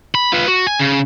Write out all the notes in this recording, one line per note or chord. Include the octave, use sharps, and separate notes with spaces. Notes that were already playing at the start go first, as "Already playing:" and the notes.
B5
F4 B4
F#4
G#5
C#3